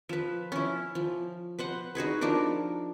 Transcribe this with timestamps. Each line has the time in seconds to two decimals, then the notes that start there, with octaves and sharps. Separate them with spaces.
0.09 F3 B4
0.52 C#4 E4
0.95 F3
1.59 B4 C5 F#5
1.95 D#4 F#4 G#4 B4
2.21 F3 D4 D#4 A#4